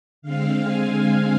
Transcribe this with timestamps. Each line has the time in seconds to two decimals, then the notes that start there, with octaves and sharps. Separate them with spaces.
0.22 D3 G#3 C4 F5
0.59 G#5